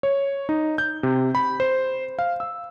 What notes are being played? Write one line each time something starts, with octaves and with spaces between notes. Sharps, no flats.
C#5
D#4
G6
C3
B5
C5
F5
E6